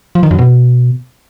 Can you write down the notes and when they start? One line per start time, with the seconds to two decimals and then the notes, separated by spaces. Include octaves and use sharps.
0.15 F3
0.23 D#3
0.31 F#2
0.38 B2